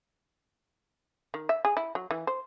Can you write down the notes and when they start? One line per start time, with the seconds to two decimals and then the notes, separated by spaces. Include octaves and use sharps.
1.34 D#3
1.49 E5
1.65 G#4
1.77 E4
1.95 F#3
2.11 E3
2.27 C5